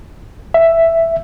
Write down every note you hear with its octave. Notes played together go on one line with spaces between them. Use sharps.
E5